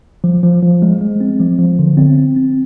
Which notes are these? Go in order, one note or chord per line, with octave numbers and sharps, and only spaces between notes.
F3
F3
F3
G#3
G#3
C4
F3
F3
D3
C4
C4
C4